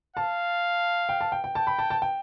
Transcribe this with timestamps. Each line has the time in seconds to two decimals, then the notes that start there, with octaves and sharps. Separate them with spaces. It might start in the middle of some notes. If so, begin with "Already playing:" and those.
0.16 F5 A5
1.09 G5
1.21 A5
1.32 G5
1.44 G5
1.55 G5 A5
1.67 B5
1.79 A5
1.90 A5
2.02 G5